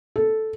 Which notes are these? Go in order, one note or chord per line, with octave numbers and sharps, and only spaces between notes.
A4